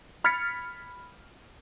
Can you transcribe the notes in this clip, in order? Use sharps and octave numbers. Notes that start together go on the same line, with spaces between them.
B5 F6 G#6 A6 B6 C#7